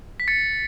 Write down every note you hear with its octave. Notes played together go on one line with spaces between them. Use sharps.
B6
A6 C#7